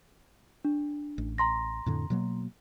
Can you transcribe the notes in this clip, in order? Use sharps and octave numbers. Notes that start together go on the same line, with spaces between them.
D4
A1
A#5 C6 A#6
F2 A2 D3
B2 F#3 A#3